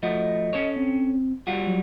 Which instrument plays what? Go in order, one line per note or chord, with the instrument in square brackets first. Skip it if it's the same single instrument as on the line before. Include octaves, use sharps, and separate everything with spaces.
[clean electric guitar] F3 A3 F#4 [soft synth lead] D#5
[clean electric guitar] C#4 A4 C#5
[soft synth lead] C4
[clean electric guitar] G3 F4 F#4
[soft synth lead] F#3